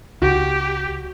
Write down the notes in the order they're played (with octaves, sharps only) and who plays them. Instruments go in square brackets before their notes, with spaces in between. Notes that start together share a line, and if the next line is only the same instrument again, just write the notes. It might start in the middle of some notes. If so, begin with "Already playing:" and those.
[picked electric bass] C#2 [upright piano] F#4 [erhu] G4